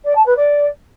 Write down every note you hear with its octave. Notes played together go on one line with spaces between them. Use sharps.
D5
A5
B4
D5